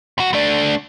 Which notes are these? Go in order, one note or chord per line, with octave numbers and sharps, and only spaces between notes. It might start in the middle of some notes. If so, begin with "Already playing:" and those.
D#2 F#4
A3 D4